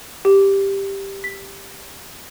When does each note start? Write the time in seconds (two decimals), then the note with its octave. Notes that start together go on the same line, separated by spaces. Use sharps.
0.25 G4
1.24 B6